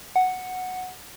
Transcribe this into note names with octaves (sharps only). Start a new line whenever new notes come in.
F#5